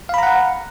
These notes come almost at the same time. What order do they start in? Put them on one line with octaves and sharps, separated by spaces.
F5 B5 A#5 F#5